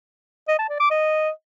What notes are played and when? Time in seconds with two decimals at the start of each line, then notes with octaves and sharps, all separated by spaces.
0.48 D#5
0.59 A5
0.70 D5
0.80 D6
0.91 D#5